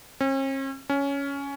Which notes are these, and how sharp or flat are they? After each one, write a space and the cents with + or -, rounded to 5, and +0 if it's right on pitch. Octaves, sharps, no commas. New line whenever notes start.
C#4 -45
C#4 +10